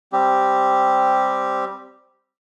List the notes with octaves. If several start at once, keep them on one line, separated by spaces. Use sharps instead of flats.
G3 C4 G4